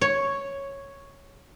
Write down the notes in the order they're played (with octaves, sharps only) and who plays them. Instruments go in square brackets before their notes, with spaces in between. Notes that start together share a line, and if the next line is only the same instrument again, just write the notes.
[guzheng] C#5